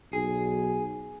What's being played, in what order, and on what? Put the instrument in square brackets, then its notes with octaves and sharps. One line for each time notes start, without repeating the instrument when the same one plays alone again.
[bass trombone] B1 [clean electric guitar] G#4